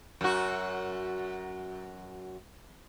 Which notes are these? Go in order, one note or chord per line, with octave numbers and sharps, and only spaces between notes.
F#2 F#4